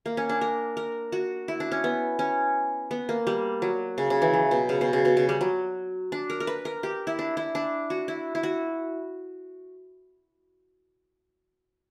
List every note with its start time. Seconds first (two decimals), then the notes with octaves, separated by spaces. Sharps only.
0.06 A#3
0.17 C#4
0.29 D4
0.41 A#4
0.77 A#4
1.12 F#4
1.48 E4
1.60 D4
1.72 C#4
1.84 B3
2.19 C#4
2.91 B3
3.09 A#3
3.27 G3
3.62 F#3
3.98 C#3
4.10 C#3
4.22 E3
4.34 F#3
4.51 B2
4.69 C#3
4.81 B2
4.93 C#3
5.05 B2
5.17 C#3
5.29 G3
5.41 F#3
6.12 D4
6.30 A#4
6.40 A#4
6.47 B4
6.65 A#4
6.83 G4
7.07 E4
7.19 D4
7.37 E4
7.55 D4
7.90 F#4
8.08 E4
8.35 E4
8.43 F#4